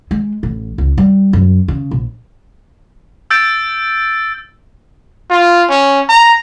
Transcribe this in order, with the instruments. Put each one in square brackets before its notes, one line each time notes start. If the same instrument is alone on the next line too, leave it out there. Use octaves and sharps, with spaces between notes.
[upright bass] G#3
A1
C#2
G3
F#2
C#3
A#1
[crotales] E6 G6 A6 D7
[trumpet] F4
C#4
A#5